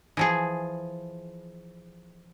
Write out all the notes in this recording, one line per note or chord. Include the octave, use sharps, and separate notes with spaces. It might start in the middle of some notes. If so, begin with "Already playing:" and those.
E3 F3 G#4